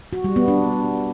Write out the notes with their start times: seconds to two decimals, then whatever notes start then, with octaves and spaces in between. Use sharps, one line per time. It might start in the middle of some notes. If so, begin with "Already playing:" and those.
0.13 F#4
0.24 G3
0.36 B3
0.48 D4